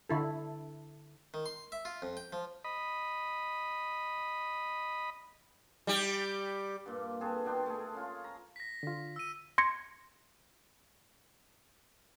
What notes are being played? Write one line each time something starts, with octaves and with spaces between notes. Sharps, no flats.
D3 E4 A4
D#3
C6
E5
F4
F2
G5
F3
D#5 B5
G3 G4
G2 A#2
C4 G#4 A4 B4
B2 D4 G5 C6
A3 G#4
C#4 F4
A#5
A#6 B6
D3 F4
E6 D#7
C6 G#6 A#6 C#7